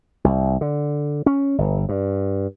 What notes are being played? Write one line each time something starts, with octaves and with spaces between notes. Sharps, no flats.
C2
D3
C#4
G1
G2